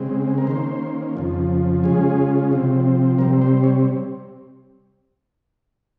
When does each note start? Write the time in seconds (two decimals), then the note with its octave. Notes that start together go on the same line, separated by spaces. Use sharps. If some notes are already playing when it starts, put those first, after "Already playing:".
Already playing: C#3 G#3 C4
0.38 A#4
0.47 D#3 A#3 C#4 C5
1.15 F2 C#3 F3
1.84 C#3 G#3 C#4 F4 G#4
2.51 C3 F3 C4
3.18 C3 G3 C4 A#4
3.42 C5
3.64 C#5